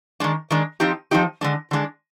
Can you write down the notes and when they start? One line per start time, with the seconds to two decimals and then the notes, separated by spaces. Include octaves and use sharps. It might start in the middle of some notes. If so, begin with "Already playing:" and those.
0.20 D#3 G#3 D4
0.51 D#3 G#3 D4
0.80 F3 C4 D#4 G4
1.11 F3 C4 D#4 G4
1.41 D3 G#3 D4
1.71 D3 G#3 D4